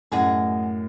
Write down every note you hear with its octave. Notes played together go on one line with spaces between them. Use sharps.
F#2 A2 G#4 D#5 F#5